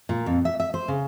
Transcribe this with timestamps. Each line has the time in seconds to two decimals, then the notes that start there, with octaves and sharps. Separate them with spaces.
0.09 A#2
0.26 F2
0.45 E5
0.60 E5
0.74 C5
0.88 C#3